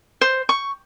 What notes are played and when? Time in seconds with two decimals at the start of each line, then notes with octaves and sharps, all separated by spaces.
0.21 C5
0.49 C#6